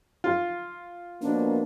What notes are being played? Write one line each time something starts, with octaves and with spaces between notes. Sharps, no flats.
F4
B2 F3 A#3 D4